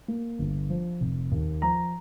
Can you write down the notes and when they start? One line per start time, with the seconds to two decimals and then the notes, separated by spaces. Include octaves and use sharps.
0.08 A#3
0.39 G1
0.70 F3
1.01 F1
1.31 D#2
1.62 F3 A#5